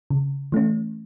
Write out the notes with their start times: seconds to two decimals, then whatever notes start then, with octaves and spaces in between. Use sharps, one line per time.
0.10 C#3
0.52 E3 A3 C#4